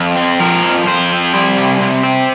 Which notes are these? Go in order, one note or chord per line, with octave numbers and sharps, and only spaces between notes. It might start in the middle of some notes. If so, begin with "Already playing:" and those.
Already playing: F2
C4
F3 A#4
F2
F2 C5
C4
G3
C3
C3
C4